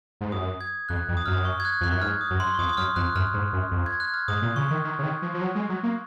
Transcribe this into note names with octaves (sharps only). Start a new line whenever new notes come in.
G#2
F#2 D#6
G#6
F2 F#6
F2
D#6
F#2 F6
D#6
C#6
G#6
F#6
F2 F#6
F#2
G#2 F6
D#6
F#2
C6
C#6
F2 D#6
D#6
F#2 F6
F2 F#6
F#2 F6
G#2
F#2
F2
G#6
F#6
F6
G#2 D#6
A#2
C#3 C#6
D#3
D#3
C#3
D#3
F3
F3
F#3
G#3
F#3
A#3